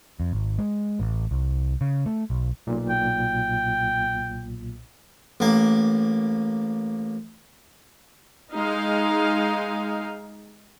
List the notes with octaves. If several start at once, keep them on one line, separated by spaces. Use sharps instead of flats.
F2
G#1
G#3
A1
C2
C#3
A3
B1
B1 A#2
G5
A1 A#3
G#3 D#4 F5